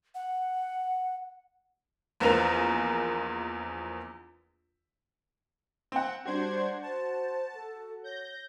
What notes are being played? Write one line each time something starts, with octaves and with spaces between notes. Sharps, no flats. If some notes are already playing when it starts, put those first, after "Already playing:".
F#5
A#1 E2 B3 C4 A#4 F7
C4 F#5
G3 D4 F#4 C5 G#6
C5 A5
A4
C#5 G6 A#6